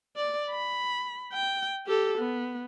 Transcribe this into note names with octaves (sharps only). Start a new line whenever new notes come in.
D5
B5
G5
G4 A4
B3